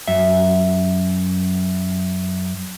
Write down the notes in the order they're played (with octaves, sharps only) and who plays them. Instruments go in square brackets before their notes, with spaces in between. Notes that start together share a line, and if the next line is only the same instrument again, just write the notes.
[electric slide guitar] F#2 E5